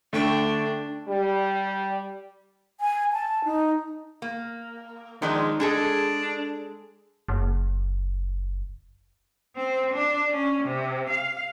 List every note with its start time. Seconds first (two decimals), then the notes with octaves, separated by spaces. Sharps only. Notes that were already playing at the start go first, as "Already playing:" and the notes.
0.13 D3 A3 D4 G5 C#6
1.08 G3
2.81 G#5
3.13 A5
3.45 D#4
4.22 A#3
5.22 D#3 F3 G#3 D4
5.60 G#3 D4 G#4 A4
7.29 F#1
9.56 C4
9.93 D4
10.31 C#4
10.63 C3
11.09 F5